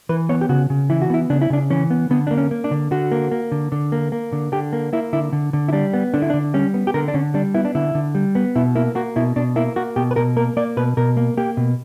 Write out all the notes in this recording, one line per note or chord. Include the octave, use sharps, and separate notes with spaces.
E3 B4
B3 C#5
G4
C#3 F#4
C#3
E3 E4
F#4
B3 E4
C#3 D4
E4
C#3 D4
E3 C#4
B3
D3 B3
A#3 D4
C#4
A#3
D4
D3
D3 F#4
A#3
A#3
D3
D3
A#3
A#3
D3
D3 G4
A#3
A#3 E4
D3 E4
D3
D3
E4
G3 D4
B3
D3 D4
E4
D4
D3
G3 C#4
B3
G4
D3 A#4
D4
D3 C#4
G3 D4
B3 E4
D4
D3 E4
D3
G3
B3
B2 E4
A#3 E4
A#3 F#4
B2 E4
B2 D4
A#3 E4
A#3 F#4
B2 G4
B4
B2 A#4
A#3 A#4
A#3 D5
B2 B4
B2 A#4
A#3
A#3 G4
B2